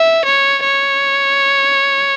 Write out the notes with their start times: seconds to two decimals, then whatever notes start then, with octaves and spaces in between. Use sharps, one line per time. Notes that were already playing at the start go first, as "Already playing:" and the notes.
Already playing: E5
0.25 C#5
0.65 C#5